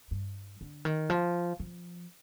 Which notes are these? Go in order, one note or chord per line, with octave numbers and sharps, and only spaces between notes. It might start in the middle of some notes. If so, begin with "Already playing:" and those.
G2
D3
D#3
F3
F3